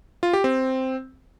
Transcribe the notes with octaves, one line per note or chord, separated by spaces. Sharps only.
F4
G4
C4